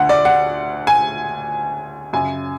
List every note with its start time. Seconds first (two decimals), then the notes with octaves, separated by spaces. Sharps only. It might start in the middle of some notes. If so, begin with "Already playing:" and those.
Already playing: D2 D3 F#5
0.09 D5
0.25 F#5
0.87 G#5
2.13 F#2 C#3 G#5